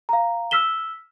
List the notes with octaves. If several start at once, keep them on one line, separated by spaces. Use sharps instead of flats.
F5 A#5
E6 F6 B6 E7 G7